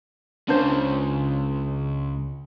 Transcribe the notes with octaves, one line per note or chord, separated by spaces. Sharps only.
C#2 C#4 D4 C5